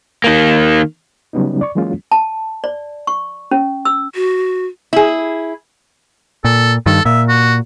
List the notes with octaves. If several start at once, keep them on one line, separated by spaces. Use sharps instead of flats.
D#3 A#3
C#3 F#3 G3 B3 C#4 D#4
D5 C#6
E3 F#3 G#3 A#3 C#4 F4
A5
D5
C#6
C#4
E6
F#4
E4 G#4
A#2 A4
G2 D#3 A4
A#2 E5
F#4